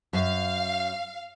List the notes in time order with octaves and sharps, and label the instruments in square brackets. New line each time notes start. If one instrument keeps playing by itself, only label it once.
[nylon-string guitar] F#2 [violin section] F5